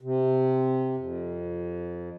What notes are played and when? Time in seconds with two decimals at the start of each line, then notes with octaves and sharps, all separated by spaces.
0.01 C3
0.98 F2